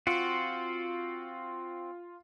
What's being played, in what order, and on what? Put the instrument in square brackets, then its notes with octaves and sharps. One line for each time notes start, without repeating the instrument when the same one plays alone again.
[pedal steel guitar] C4 F#4 [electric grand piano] F4